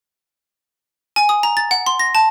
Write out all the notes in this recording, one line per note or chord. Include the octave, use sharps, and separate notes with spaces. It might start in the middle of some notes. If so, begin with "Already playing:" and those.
G#5
D#6
A#5
A6
F#5
C6
A#6
A5